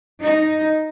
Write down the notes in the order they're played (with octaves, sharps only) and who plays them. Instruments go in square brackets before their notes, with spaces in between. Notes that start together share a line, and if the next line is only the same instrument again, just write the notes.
[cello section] D#4